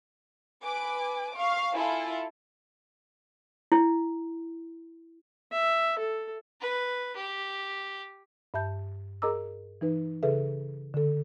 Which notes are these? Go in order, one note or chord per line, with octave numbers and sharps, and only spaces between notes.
B4 G#5 D6
F5 C#6
E4 F4 A4 G#5
E4
E5
A4
B4
G4
G2 E5 A5 G6
G#4 A#4 D#5 A#5 D6 E6
E3 D#4 B4
C#3 G#4 A4 B4 E5
D3 A4